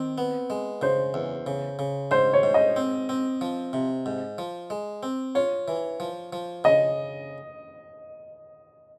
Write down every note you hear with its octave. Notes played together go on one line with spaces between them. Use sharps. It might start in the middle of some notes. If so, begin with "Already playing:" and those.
Already playing: D#3 C4
B3
G#3
C#3 C5
E2
C#3
C#3
G#2 C5
C#5
G#2
D#5
C4
C4
F3
C3
G#2
F3
G#3
C4
F4 C#5
E3
F3
F3
C#3 D#5